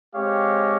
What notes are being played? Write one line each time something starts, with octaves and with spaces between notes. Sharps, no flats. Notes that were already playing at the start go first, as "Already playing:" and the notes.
G#3 C4 G4 C#5 F5